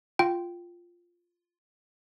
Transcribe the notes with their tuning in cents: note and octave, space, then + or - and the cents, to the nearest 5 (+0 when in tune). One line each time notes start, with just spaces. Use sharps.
F4 +0 G5 -10